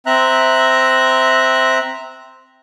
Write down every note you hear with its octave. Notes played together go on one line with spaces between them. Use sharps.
C4 E5 A#5 F#6